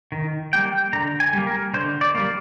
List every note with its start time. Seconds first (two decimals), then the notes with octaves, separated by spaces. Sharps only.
0.12 D#3
0.53 G3 A#3 G5
0.93 D3 A#5
1.20 G#5
1.33 G3 A#3
1.47 A#4
1.74 D3 C5
2.01 D5
2.15 G3 A#3